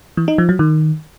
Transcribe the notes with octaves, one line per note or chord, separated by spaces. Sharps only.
E3
D#4
F3
F#3
D#3